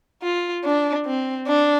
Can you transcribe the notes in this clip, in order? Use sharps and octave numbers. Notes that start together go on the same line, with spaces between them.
F4
D4
C4
D4